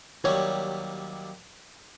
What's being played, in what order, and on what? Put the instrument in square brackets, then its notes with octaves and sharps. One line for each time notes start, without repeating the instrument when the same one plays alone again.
[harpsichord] D#2 F#3 G3 [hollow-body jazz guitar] C#5